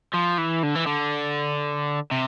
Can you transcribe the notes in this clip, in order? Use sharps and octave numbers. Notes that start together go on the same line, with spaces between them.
F3
E3
D3
E3
D3
C3